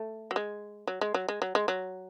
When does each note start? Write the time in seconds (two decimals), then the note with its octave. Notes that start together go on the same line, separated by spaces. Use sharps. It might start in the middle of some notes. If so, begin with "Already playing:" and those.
Already playing: A3
0.31 F#3
0.36 G#3
0.87 F#3
1.01 G#3
1.14 F#3
1.28 G#3
1.42 F#3
1.55 G#3
1.68 F#3